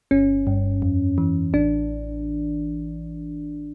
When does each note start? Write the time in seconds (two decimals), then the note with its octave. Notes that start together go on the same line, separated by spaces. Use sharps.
0.11 G1 C#4
0.47 G2
0.82 F2
1.18 E3
1.53 A1 D4